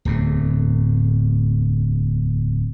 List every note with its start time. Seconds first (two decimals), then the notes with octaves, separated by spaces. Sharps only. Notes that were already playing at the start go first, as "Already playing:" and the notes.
0.05 D1 E2 A2